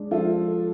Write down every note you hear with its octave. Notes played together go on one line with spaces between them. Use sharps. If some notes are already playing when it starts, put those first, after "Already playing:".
Already playing: G#3 D4
F3 F4 A4
A4